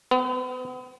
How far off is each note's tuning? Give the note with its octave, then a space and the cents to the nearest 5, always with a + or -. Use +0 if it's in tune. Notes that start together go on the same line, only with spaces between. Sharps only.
B3 +40